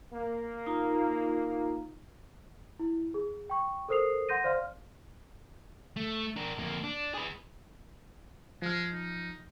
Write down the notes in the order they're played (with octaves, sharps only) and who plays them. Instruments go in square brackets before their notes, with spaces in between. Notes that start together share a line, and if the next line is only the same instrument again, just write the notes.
[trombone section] A#3
[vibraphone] D#4 F4 A#5
[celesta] E4
G#4
G5 C#6
A4 A#4 C5 D#6 C7 F7
F#5 C6 G6 A#6 D#7
C5 D5 F5 C6 F6
[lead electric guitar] A3
D4 A#4
F2 A#3
D4
G#4 B4
[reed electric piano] F3 F6 [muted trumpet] G#3
[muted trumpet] D#4